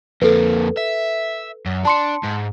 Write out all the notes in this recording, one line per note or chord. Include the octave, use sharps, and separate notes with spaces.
F2 A#3 A4 B4
E5
F#2
D4 A5 C6 C#7
G#2